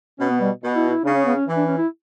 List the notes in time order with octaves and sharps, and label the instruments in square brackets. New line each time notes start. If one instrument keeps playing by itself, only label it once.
[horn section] B2 [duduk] C#4
[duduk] B3
G3
[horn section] B2
[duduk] E4
E4
[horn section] C#3 [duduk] D4
[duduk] C#4
B3
C#4
[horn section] E3
[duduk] D4
C#4
E4